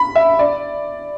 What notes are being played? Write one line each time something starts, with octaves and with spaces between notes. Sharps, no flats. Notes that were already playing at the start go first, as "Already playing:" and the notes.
Already playing: B5
E5
D5